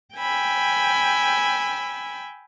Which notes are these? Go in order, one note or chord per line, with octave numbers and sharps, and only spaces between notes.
G5 G#5 B5 E6